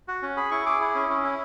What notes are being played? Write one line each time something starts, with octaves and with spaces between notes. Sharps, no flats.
F#4
C#4
G#4 B5
E4 C#6
G#4 D6
E4
C#4
C#4
E4